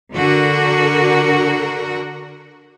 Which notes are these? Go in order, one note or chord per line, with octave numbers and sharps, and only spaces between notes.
D3 F#4 A#4